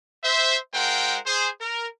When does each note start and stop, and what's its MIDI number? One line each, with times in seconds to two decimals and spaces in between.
0.24 0.57 72
0.24 0.57 76
0.74 1.18 56
0.74 1.18 65
0.74 1.18 70
0.74 1.18 72
0.74 1.18 78
0.74 1.18 79
1.27 1.49 68
1.27 1.49 72
1.60 1.87 70